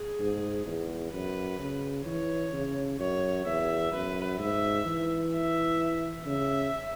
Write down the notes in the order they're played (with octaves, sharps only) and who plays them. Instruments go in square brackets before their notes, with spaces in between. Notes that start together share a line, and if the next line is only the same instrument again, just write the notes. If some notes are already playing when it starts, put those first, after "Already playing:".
Already playing: [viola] G#4
[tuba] G#2
E2
[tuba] F#2 [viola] B4
[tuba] C#3
[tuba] E3 [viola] C#5
[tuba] C#3
[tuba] F#2 [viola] C#5
[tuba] E2 [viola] E5
[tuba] F#2 [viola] B4
[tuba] G#2 [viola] E5
[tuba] E3
[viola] E5
[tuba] C#3 [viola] E5